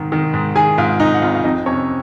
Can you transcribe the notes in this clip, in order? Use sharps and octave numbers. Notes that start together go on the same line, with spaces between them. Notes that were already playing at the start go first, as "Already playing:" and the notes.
Already playing: G#2 D#3
D#3
G#2
D#3 G#4 G#5
G#2 F4 F5
G#2 D#4 D#5
F#5
G#1 F4 F5
F5
F2 D#4 D#5
C3 C#4 C#5